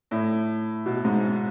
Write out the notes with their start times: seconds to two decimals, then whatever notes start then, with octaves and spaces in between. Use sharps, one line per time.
0.11 A2
0.86 B2
1.05 G#2